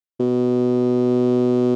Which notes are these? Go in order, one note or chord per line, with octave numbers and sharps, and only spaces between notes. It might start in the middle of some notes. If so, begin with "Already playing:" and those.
B2